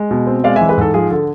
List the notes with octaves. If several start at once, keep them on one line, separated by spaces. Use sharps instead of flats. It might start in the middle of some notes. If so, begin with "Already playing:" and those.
Already playing: G#3
B2
C4
G#3 D5 F5
E5 G#5
E3
G#4 B4
G#2 A4
F3 G#4
D3 A4